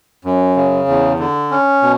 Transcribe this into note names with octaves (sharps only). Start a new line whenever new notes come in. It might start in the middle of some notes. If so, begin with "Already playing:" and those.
F#2
C#3
E2
D3
C#4
B2